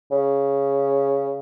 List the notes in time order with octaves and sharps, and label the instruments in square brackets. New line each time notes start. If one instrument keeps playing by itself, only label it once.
[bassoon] C#3